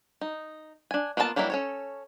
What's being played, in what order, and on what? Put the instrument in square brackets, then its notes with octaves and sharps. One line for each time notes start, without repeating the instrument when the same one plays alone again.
[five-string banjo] D#4
D4 G#5
A#3 B3 F4 F#4 A5
F#3 G3 A#3 D4 E4
C#4 A4 C#5